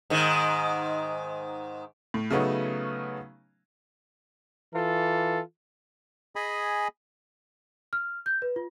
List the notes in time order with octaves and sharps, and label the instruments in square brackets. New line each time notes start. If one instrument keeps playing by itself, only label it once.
[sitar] G#2 D#3
[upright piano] A2
C#3 F#3 A3 B3 C#4 D#4
[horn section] E3 F4 A4
[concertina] G#4 D#5 G#5 B5
[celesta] F6
G6
B4
F4